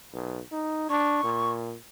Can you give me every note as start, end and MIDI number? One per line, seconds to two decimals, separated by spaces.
0.13 0.40 35
0.52 0.89 63
0.90 1.21 62
0.90 1.51 85
1.24 1.75 46